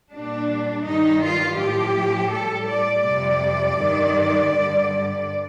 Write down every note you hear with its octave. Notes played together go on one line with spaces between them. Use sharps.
A#2 G3 D4
G2 D#3 G3 D#4
F4
A2 F3 G4
A2 G3 A4
D5
F2 C3 G3 D5
G2 D#3 G3
G2 D3 G3